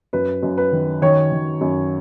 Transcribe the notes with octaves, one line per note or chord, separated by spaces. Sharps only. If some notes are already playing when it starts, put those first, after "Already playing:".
F#2 B4
F#2
B4
D#3
D#3 C#5
D#3
F#2